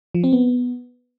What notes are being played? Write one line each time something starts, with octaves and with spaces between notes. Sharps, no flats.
F3
C4
B3